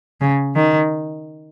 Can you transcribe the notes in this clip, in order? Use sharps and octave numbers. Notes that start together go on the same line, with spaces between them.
C#3
D#3